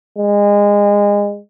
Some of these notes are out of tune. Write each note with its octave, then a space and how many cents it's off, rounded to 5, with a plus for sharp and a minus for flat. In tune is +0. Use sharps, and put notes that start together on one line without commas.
G#3 -25